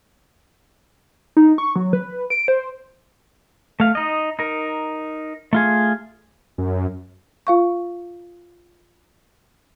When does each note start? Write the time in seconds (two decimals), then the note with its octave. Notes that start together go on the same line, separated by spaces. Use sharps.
1.37 D#4
1.58 C#6
1.76 F#3
1.93 B4
2.30 D7
2.48 C5
3.80 A3 F5
3.95 D#4 D#5
4.39 D#4 A#4
5.53 A3 F4 G#4
6.58 F#2
7.47 F4 F5 C#6